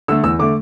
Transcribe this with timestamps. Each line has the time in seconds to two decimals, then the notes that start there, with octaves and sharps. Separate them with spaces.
0.08 D3 A3 E6
0.23 E2 E6
0.39 D3 A3 D6